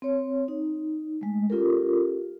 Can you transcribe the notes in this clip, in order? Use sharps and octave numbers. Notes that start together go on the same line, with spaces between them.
C4 C#5
D#4
G#3 A3
C#4 F4 G4 A4 A#4